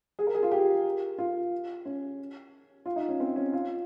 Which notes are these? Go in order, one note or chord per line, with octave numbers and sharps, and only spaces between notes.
G#4
A#4
G#4
F4
G4
F4
C#4
F4
D#4
C#4
C4
C#4
F4